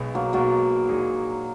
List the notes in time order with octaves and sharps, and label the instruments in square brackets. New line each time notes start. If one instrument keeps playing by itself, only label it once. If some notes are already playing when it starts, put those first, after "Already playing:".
Already playing: [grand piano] B1 B2 G#3 B3
[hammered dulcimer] F#3 A#3
[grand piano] B1 B2 G#3 B3 [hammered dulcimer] F#3 A#3
[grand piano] A#1 A#2 G#3 D#4 G#4